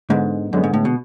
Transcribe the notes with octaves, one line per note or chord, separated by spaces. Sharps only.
G#2 D3 G#3 B3
F#2 D3 G#3 B3
G#2
A2
B2